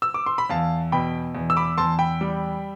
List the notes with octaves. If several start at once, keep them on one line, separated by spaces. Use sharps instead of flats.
E6
D6
C6
B5
E2 F5 A5
B2 G5 B5
E2
E6
B5 D6
E2 A5 C6
G5 B5
G3